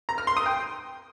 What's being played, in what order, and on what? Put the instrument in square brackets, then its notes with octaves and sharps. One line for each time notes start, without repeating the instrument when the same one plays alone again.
[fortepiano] A#5
F6
C6
D#6
G5